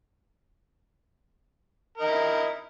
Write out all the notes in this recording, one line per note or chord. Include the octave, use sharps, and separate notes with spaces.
E4 A#4 D#5